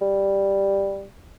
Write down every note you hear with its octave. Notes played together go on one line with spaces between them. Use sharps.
G3